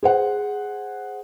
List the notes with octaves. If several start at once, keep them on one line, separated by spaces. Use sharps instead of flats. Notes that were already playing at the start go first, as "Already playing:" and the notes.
G#4 C5 F#5